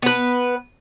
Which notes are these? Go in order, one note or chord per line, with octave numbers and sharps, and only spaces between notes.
B3 B4